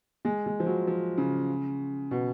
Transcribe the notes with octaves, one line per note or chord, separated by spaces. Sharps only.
G#3
G#3
F3
F#3
F3
C#3
B2